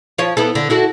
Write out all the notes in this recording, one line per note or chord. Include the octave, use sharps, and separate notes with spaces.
F3 C#5
B3 E4 A4
D3
E4 F#4 A4